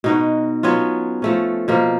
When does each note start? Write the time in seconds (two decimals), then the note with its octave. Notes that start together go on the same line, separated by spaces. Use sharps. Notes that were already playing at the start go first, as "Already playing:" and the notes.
0.04 B2 D#4 F#4
0.63 F#3 B3 C#4 F4
1.22 F3 A3 C#4
1.68 B2 F3 A#3